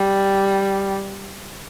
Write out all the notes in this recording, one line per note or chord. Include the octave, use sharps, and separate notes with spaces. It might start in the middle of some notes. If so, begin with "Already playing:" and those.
Already playing: G3